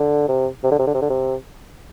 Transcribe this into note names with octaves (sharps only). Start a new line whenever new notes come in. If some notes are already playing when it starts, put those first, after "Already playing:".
Already playing: D3
C3
C3
D3
C3
D3
C3
D3
C3